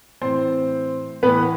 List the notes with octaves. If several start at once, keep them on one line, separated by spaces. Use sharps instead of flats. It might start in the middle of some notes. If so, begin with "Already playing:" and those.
A2 E3 C4 C5
A2 E3 B3 B4